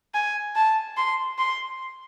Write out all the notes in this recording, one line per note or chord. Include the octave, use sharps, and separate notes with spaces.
G#5
A5
C6
C6